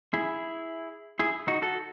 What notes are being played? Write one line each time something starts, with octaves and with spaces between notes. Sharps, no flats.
E4 G#4
E4 G#4
D#4 F#4
F#4 A4